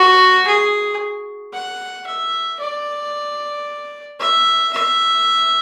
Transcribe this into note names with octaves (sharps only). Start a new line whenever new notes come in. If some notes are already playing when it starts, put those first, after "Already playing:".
Already playing: F#4
G#4
F#5
E5
D5
E5
E5